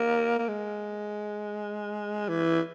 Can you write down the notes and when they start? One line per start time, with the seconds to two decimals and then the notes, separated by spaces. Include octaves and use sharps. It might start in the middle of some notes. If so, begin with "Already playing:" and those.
Already playing: A#3
0.39 A#3
0.48 G#3
2.29 E3